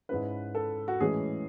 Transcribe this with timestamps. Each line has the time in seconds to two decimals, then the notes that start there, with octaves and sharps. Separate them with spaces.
0.09 G#2 G#3 C#4 E4 B4
0.55 A4
0.88 F#4
1.00 A2 E3 G#3 C#4 G#4